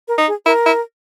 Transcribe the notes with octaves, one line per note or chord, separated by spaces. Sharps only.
A#4
D#4
G#4
E4 A#4
E4